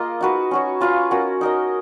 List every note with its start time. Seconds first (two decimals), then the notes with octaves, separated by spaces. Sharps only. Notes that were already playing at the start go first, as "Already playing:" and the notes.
Already playing: A#3 F4 G#4 A#4 D#5
0.21 D#4 F#4 B4
0.51 C#4 F#4 C#5
0.81 C#4 F4 B4 F5
1.11 C#4 F#4 A#4
1.41 D#4 A#4 D#5